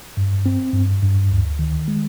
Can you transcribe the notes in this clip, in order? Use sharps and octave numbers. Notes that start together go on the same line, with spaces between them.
G2
C4
G2
G2
D2
D#3
G#3